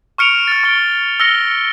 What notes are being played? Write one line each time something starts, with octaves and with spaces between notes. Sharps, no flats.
C#6 F6 C#7 D7 F7
F6 A6
C#6 D7 G7
E6 F6 A#6 C#7 G7